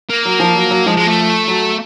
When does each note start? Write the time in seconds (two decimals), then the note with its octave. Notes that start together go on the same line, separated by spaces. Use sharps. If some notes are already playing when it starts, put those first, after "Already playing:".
0.10 A#3
0.25 F#3
0.40 F3
0.56 F#3
0.71 F#3
0.86 F3 G#3
0.96 G#3
1.07 A3
1.48 F#3